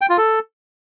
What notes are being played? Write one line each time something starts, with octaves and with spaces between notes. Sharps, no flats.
G5
F4
A4